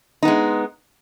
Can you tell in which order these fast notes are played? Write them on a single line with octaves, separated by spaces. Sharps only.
D#4 B3 G#3